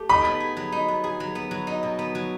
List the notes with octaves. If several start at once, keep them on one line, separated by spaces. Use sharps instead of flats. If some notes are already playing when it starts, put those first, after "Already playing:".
Already playing: A3 G4
D#4 B5
B3
G#4
F#3
D#4
B3
G#4
F#3
B3
F#3
D#4
B2
B3
F#3